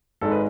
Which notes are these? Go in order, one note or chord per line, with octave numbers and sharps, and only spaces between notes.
G#1 G#2 G#3 A4
B4